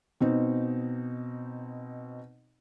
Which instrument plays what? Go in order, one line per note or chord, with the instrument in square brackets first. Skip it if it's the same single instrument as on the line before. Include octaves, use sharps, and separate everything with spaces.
[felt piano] B2 C4 D#4